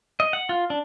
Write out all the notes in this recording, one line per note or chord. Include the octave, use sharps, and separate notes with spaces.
D#5
F#5
F4
D4